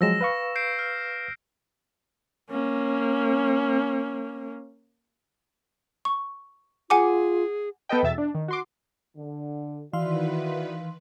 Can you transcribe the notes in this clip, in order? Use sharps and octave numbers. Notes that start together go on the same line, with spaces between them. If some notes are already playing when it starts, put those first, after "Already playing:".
F3 F#3 G#3 E6 A#6 E7
B4 F5 C#6
G6 C7 D7
F6
A#3 C#4
C#6
F4 G#4 F#5 G#5 D6
B3 A4 B4 D#5 G5
E2 B2 E5 A6
D4
D#3
F#4 C6 D6
D3
D#3 E3 E4 F#4 B4 D5 F5 C6